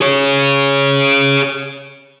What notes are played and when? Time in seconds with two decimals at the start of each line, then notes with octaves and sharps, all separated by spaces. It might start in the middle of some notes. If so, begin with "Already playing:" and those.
0.01 G#4 C#5